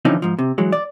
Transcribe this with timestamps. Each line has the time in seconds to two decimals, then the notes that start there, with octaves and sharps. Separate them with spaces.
0.05 D3 E3 F3 C4 C#4 D#4
0.22 G#2 F3
0.39 C3
0.58 E3 F#3 G#3
0.72 D5